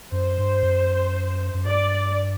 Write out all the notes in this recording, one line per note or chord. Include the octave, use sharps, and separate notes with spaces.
F#2 C5
G2
F#2
F#2
G2 D5